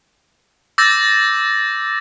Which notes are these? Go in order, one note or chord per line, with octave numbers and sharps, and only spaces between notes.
D6 E6 G6 A6 A#6